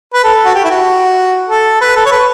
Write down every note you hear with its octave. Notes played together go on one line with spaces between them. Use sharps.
B4
A4
F#4
G4
E4
F#4
A4
B4
A4
C#5
B4